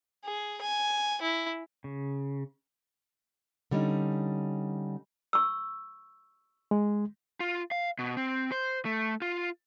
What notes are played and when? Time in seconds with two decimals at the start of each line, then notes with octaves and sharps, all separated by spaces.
0.25 G#4
0.61 G#5
1.21 E4
1.84 C#3
3.71 D3 G3 C#4 D#4
5.33 C#6 E6
6.71 G#3
7.40 F4
7.71 F5
7.99 B2
8.17 C4
8.52 C5
8.85 A3
9.22 F4